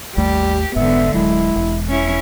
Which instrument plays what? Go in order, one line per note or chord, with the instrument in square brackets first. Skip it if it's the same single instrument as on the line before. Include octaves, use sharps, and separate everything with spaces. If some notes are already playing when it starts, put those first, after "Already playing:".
[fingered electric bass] G#1 D#2 A3 [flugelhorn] G3 [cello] G4
[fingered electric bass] F1 G#2 [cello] D3 B3 [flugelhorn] E5
[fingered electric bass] D1 F#3 [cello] G#3 [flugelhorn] E4
[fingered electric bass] E1
[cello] C#4 E4